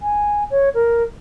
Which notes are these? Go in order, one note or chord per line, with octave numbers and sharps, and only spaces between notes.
G#5
C#5
A#4